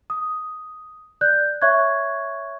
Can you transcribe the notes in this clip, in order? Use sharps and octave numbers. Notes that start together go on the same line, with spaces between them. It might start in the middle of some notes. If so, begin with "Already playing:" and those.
D#6
D5 F#6 G6
C#5 E5 C#6 F#6 G#6